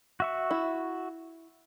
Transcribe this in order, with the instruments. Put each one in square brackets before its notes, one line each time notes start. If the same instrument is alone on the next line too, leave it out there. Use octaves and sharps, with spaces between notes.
[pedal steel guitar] F#4 E5 C#6
[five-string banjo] E4